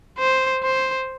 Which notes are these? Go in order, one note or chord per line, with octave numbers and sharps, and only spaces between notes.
C5
C5